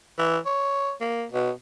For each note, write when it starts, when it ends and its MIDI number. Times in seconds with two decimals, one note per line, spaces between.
0.19 0.38 52
0.46 0.92 73
1.01 1.25 58
1.32 1.51 47